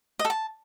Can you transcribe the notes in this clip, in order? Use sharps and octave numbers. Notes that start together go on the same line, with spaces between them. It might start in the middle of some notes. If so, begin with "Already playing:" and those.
D#5
A4
A5